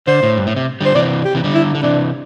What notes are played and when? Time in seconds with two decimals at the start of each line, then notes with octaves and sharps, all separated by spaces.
0.07 D3 C5
0.23 A2
0.37 G2
0.47 A2
0.56 C3
0.81 D3 G3 C5
0.95 C3 E3 D5
1.25 G4
1.35 C3 E3
1.44 D3 G3
1.54 E4
1.75 D3
1.83 C3 E3 D4